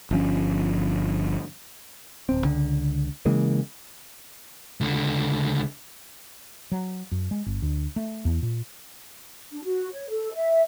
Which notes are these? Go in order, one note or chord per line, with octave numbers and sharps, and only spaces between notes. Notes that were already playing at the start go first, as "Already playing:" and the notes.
G1 F3 C#4
D1 C4
C#2 D3
C#3 E3 G#3 A#3
C#2 D3
F#3
F#2
G#3
G1
D2
A3
E2
A#2
D4
F#4
C#5
A4
E5